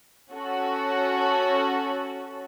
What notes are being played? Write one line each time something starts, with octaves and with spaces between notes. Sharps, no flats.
C#4 F#4 A4